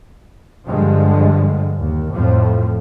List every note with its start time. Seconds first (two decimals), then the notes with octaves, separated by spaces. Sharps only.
0.68 G2 D3 F3 G#3
1.79 D#2
2.12 F2 A2 F3